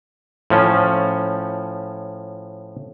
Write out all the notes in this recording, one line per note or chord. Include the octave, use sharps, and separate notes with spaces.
A2 F3 C#4